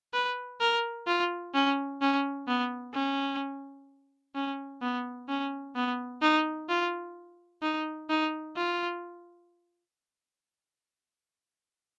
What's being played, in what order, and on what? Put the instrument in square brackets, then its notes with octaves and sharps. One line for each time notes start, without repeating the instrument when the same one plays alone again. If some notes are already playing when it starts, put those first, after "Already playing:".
[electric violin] B4
A#4
F4
C#4
C#4
B3
C#4
C#4
B3
C#4
B3
D#4
F4
D#4
D#4
F4